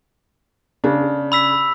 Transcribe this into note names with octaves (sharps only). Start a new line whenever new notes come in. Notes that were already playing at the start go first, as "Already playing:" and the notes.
C#3 D4
B5 E6 B6